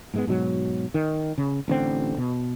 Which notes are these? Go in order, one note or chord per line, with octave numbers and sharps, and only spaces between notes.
G#2 G#3 B3
G#2 B2 F#3
D#3
C#3
A1 D3 C4
B2